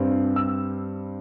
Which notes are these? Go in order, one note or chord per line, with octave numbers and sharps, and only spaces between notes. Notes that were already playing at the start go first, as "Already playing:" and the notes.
Already playing: G2 G3 C4
E6